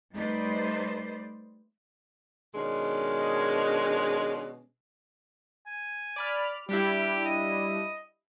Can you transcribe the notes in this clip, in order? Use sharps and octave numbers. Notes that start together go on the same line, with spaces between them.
G3 A3 D#4 B4 C5 D5
B2 D#3 G#3 C#4 D4
G#5
D5 B5 F6
G3 D4 E4 G4
D#5